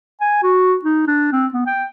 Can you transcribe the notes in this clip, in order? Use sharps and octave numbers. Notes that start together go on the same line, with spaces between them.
G#5
F#4
D#4
D4
C4
B3
G5